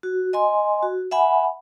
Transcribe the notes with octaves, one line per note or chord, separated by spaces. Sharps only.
F#4
D#5 G#5 C6
F#4
E5 F#5 G#5 B5